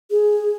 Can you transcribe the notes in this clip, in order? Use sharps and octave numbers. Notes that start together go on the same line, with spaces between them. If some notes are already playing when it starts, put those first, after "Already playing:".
G#4